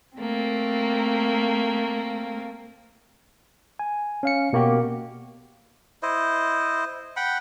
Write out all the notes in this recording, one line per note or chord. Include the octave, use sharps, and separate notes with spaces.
A3 A#3 C4
G#5
C#4 F5 C#7
B2 A#3 F#4 G4
E4 C5 D#5
F#5 G5 B5